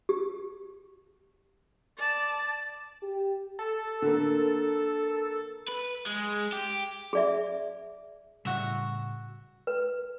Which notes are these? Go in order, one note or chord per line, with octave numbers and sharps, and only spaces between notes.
G4
D5 A5
G4
A4
D3 A#3
B4
G#3
G4
G#4 D5 E5
A2 C#3 G3 F#4 E5
B4